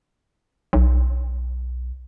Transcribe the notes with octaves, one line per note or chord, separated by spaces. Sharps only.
B1